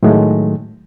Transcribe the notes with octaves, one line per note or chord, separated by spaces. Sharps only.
A2 D#3 F#3 G#3 A3